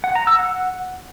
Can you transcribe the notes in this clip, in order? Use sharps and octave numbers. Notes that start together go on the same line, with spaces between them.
F#5
A#5
E6
F#5